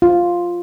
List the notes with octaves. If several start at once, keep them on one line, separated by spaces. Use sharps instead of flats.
F4